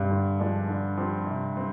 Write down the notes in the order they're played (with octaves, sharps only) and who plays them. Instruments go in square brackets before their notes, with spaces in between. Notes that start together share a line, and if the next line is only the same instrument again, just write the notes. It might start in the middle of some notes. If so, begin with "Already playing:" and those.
Already playing: [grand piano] G2
[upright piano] D3
F3 G#3 D4
D3
F3 C4 G4
C3
G3 C4